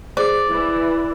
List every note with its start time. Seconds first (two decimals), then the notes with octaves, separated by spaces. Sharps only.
0.17 G#4 C5 D5
0.50 E3 E4